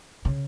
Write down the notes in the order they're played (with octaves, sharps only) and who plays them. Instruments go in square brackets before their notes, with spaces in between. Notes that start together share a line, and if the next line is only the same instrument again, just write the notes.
[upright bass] C#3